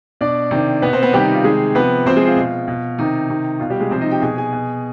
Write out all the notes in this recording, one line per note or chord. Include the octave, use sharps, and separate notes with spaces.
B2 D4 D5
C3 D#3
B2 B3 B4
C4 C5
B3 B4
C3 D#3 G3 G4
D#4
F4
C3 D#3 G#3 G#4
C3 F3 B3 B4
C3 F3 C4 C5
G#3 G#4
F4
B2
B2
C3 D#3 D#4
C3 D#3
B2 F4
G3 G4
G#3 G#4
C3 F3 C4 C5
D#4 D#5
G4 G5
B2 G#4 G#5
G#4 G#5
B2